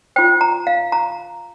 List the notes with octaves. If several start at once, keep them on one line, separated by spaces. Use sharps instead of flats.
F4 C5 G5
A#5
F5
A#5